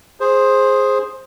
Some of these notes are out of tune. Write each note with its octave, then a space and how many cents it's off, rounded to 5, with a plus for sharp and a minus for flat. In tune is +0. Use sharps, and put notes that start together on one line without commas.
G#4 +0 C5 +10